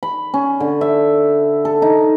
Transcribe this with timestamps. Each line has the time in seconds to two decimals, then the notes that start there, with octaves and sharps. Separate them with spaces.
0.03 B5
0.34 C#4
0.60 D3
0.81 E5
1.65 A4
1.82 D#4